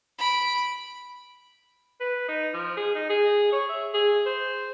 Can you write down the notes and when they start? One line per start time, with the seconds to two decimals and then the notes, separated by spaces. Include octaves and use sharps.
0.18 B5 D7
2.00 B4
2.28 D#4
2.54 F3
2.77 G#4
2.95 D#4
3.09 G#4
3.53 C#5
3.69 E5
3.94 G#4
4.26 C5